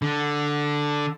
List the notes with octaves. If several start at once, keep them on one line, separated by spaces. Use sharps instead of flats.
D3